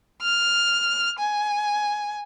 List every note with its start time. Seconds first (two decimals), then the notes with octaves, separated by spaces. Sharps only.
0.21 F6
1.19 G#5